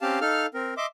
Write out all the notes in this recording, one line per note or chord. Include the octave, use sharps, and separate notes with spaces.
C4 C#4 G4 F5 A5
D#4 A4 F5 F6
C4 A#4
D#5 E5 C6 D6